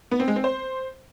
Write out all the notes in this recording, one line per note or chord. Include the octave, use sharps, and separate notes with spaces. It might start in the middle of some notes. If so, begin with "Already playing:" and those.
B3
C4
G#3
C4
C5